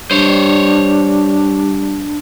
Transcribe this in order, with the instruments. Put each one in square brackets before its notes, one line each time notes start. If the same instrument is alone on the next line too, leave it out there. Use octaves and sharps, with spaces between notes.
[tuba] G3 [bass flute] D4 [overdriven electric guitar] C5 C#5